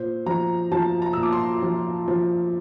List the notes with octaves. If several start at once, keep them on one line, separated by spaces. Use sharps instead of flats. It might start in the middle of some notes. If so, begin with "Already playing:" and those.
Already playing: A#2 C5
F3 A#5
F3 A5
A#5
A#2 E6
D6
C6
F3
F3